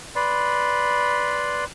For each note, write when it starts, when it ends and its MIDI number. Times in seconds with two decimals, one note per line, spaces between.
0.16 1.64 71
0.16 1.64 74
0.16 1.64 83
0.16 1.64 84